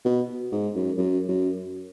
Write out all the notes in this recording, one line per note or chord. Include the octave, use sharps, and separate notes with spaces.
B2
G#2
F#2
F#2
F#2